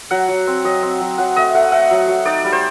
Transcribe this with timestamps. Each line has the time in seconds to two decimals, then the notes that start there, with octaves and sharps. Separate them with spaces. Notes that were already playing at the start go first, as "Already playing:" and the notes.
0.11 F#3 F#5
0.28 F#3
0.47 C4
0.64 F#3 D#5
0.83 C4
1.01 F#3
1.18 F#3 F#5
1.36 A3 D#5
1.55 A3 F#5
1.72 A3 F#5
1.91 F#3
2.08 F#3
2.25 D#4 D5
2.44 G3
2.52 C5